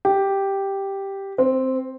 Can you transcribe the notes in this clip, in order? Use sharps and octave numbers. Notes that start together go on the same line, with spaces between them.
G4
C4